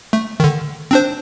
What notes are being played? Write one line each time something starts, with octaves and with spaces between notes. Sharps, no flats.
A3
D3 D#3
C4 D4 C5